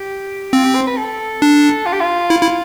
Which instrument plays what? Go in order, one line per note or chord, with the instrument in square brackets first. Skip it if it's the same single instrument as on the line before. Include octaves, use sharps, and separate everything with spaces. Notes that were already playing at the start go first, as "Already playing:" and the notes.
Already playing: [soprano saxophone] G4
[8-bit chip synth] C4 [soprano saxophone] F4
[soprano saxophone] G4
C5
B4
A4
[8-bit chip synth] D4
[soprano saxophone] F4
G4
F4
[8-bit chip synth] E4
E4